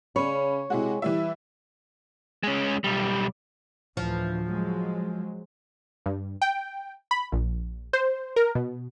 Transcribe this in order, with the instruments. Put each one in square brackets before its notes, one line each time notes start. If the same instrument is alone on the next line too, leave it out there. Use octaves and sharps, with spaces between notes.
[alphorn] C#3 [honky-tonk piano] C#4 B5 [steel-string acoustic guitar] C#5
[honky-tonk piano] C3 E4 F#4 [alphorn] G#3
[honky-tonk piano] E3 G3 E5 [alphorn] E4
[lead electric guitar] G#3 C#4
B1 G3
[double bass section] D2 A2 E3 [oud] F3
[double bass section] F#3 G#3
[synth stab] G2
G5
B5
A#1
C5
A#4
B2